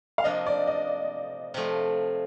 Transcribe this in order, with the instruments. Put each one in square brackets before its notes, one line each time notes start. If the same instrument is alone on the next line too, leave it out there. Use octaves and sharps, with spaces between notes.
[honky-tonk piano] F5
[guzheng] C3 F3 A#3 D4 [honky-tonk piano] D#5
[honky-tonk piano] D5
D#5
[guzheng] C3 F3 A3